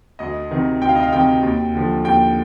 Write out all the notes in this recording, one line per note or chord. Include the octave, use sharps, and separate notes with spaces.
D2 D#5
C3 D#3
D2 G5
F5
D#5
F5
C3 D#3 G5
D#2
D3 F3
D#2 G5